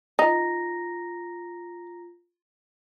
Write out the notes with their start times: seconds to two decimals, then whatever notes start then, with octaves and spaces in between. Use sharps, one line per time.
0.19 D#4 F4 A#5 A#6